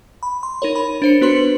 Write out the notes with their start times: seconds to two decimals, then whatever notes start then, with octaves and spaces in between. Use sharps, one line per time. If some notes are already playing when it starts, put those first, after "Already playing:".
0.23 B5
0.43 C6
0.62 D#4 A#4 C#5
0.75 B5
1.02 D4 C5 C#7
1.21 B3 F#4 B4 C6 F#7